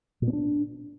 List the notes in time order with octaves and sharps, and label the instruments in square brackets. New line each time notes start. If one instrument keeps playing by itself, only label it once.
[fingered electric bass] A#2
B3
D4